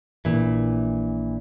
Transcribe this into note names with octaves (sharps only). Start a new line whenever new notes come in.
A#1 A#2 E3